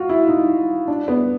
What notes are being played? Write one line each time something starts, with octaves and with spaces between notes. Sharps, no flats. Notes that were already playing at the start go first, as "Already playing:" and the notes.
Already playing: F4 F#4
E4
D#4
D4
B3